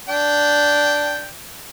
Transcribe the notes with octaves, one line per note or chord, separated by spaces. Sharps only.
D4 G5